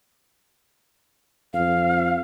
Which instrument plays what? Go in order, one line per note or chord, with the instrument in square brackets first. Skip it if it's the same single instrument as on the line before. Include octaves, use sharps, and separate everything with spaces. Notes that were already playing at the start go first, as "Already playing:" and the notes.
[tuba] F2 [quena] F5